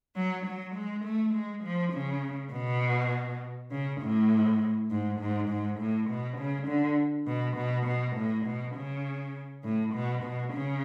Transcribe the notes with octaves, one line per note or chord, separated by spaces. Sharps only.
F#3
F#3
G#3
A3
G#3
F3
C#3
B2
C#3
A2
G#2
G#2
G#2
A2
B2
C#3
D3
B2
B2
B2
A2
B2
C#3
A2
B2
B2
C#3